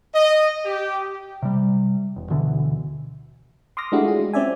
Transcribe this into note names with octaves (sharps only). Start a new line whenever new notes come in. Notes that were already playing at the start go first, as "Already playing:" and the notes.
D#5
G4
C3 G3
E1
D2 B2 D3 E3
C6 D6 D#6 F6 A#6
G#3 A3 D4 E4 F#4 G4
F4 G#4
G#3
C4 C#4 D5 E5 G#5